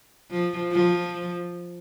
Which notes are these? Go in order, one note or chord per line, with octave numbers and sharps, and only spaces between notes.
F3
F3